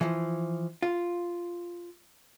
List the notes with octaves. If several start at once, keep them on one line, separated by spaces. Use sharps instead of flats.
E3 F3
F4